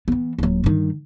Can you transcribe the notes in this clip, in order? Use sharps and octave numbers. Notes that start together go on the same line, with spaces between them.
E3 B3
D#1 F#3
G2 D#3